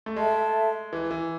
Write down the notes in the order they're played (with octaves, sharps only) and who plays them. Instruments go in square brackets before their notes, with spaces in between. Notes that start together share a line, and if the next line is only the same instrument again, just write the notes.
[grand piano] A3
[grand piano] G#3 [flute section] A4 E5 A5
[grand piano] E3
E3